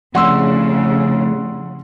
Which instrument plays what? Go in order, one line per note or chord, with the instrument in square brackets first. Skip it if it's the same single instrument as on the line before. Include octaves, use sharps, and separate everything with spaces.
[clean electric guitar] F2 A2 G3 [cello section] C#3 [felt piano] F#5 C6 E6